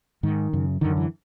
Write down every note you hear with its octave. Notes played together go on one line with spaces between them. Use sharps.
G#2 D#3
F#2 C#3
F#2 D3 D#3
E3